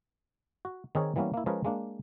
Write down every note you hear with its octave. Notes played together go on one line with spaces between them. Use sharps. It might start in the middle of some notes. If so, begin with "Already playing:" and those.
F#4
D#3 C4 D#4 G#4 A#4 C#5
E3 G3 A#3 B3 C#4
A#3 E4
F3 G#3 C#4 G#4 A#4 B4
G#3 A#3 D4